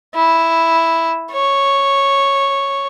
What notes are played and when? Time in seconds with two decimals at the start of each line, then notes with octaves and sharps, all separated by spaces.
0.15 E4
1.32 C#5